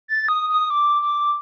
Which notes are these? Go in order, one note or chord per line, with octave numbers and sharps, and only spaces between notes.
A6
D#6
D#6
D6
D6